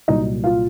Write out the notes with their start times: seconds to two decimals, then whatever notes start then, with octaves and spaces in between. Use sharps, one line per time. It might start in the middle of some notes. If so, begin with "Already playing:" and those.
0.08 C2 A#2 F#3 D#4 D#5
0.44 F4 F5